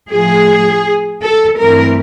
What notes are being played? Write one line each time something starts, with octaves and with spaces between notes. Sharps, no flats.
A2 F3 A3 G#4
A4
G2 E3 A3 C4 A#4